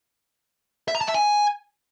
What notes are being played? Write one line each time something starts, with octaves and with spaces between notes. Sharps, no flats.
E5
A#5
A5
E5
G#5